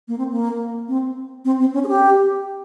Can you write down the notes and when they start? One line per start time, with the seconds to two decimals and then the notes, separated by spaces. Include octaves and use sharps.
0.08 A#3
0.18 C4
0.31 A#3
0.88 C4
1.45 C4
1.60 C4
1.74 C#4
1.84 G#4
1.88 G4